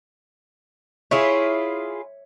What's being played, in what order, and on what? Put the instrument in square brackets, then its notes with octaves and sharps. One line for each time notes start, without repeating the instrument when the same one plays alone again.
[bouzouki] E4 F4 G#4 [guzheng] C#5 E5